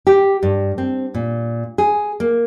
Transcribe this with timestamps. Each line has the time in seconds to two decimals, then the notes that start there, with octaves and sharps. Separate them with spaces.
0.07 G4
0.43 G2
0.78 C4
1.14 A#2
1.78 G#4
2.20 A#3